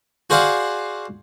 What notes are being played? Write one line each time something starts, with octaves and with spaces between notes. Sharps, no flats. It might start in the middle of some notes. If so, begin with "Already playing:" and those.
F#4 G#4 C5 D5 F5 F#5